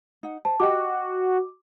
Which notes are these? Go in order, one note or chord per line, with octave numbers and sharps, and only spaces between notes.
D#4 F#5
C5 A5
F#4 G4 D#5 G5 D6